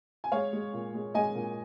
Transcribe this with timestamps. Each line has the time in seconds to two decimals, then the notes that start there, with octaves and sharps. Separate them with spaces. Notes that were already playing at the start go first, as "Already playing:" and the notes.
0.24 G#5
0.32 G#3 C#5 F5
0.53 G#3
0.74 A#2
0.94 G#3
1.14 G#3 D#5 G#5
1.35 A#2